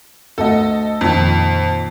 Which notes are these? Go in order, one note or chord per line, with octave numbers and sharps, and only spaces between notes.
D2 A3 A4 D#5 F#5
F2 A#2 D#3